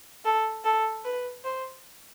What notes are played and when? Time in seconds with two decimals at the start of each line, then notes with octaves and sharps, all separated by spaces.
0.25 A4
0.64 A4
1.05 B4
1.44 C5